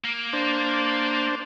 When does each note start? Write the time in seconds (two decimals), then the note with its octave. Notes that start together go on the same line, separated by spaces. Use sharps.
0.05 A#3
0.33 D4 C5